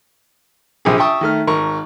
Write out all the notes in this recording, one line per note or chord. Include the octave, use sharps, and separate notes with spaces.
A#1 C3 G4 G#4
E5 G5 A5 C#6 D#6 E6
D#3 A3 F6
G#1 A#4 C#6